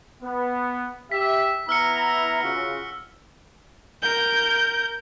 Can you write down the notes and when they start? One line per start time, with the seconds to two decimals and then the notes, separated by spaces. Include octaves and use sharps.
0.23 B3
1.12 G4 E5 B6
1.69 B3 E4 A#5 E6 F6 C#7
2.43 C#3 F4 F#4
4.03 A#4 G6